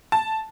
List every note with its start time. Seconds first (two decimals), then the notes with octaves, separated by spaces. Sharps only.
0.12 A5